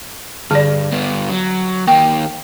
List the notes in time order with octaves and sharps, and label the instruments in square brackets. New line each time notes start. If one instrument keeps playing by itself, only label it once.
[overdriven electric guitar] G2 [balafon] D3 D5
[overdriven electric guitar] G2 B3
F#3
[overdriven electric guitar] D#2 A#3 [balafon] G5